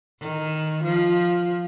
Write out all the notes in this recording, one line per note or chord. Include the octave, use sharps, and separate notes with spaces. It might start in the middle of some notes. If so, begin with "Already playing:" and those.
D#3
F3